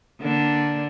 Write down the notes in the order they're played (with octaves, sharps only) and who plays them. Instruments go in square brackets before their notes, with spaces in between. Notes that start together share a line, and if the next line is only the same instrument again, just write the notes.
[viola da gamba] D3 A#3 D4